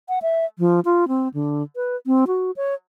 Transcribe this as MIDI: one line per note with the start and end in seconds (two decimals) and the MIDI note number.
0.09 0.19 78
0.22 0.45 76
0.59 0.80 53
0.85 1.08 65
1.08 1.28 60
1.34 1.63 50
1.76 1.96 71
2.07 2.25 60
2.27 2.51 66
2.56 2.74 73